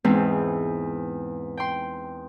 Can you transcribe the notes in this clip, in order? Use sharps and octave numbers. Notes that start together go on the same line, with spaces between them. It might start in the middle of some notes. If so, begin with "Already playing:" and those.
E2 G#2 E3 G#3 C4
G5 C6